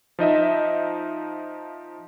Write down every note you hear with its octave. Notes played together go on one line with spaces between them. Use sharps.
F3 D#4 D#5 E5